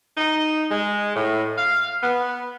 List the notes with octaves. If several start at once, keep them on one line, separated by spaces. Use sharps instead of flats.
D#4
G#3
A2
F5
B3